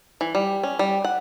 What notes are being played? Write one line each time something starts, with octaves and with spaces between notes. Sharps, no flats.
E3
G3
C#4
G3
F#5